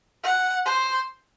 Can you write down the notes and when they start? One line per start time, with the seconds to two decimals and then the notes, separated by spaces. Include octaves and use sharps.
0.23 F#5
0.65 C5